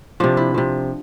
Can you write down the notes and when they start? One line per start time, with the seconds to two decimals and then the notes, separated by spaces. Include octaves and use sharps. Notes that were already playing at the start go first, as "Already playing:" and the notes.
0.20 C3 F3 D4
0.37 E4
0.54 C3 F3